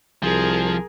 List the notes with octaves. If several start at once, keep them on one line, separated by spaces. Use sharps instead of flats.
C2 F3 G#4 A#4